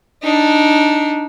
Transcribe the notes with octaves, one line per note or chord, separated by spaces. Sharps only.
D4 D#4